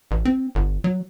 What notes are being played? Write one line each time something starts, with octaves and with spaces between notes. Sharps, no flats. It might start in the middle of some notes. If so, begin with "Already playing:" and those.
A1
C4
G1
F#3